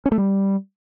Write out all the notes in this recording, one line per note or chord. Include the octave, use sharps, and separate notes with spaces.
C#4
A3
G3